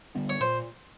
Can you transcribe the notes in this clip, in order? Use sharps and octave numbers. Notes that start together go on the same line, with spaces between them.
D3 G3 B3
C#5
A#2 C5